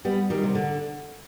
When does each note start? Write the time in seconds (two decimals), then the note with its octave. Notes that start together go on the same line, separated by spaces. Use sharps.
0.05 G3 B3
0.30 D#3 G3
0.43 C3
0.55 D3